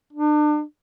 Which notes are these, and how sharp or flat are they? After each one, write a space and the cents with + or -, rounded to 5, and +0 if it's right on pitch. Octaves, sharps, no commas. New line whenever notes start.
D4 +35